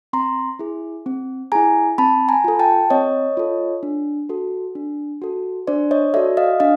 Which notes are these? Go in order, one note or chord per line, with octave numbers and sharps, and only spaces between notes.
C4 A#5 C6
E4 G#4
C4
E4 G#4 G#5 A#5
C4 A5 B5
G#5 A#5
F4 A4
G5 A5
C4 C#5 D#5
F4 A4
D4
F#4 A4
D4
F#4 A4
D4 C5 D5
C#5 D#5
F#4 A4 D5 E5
D#5 F5
D4 D#5 F5